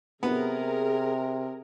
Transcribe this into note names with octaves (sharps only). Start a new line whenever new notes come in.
C3 B3 G#4 A#4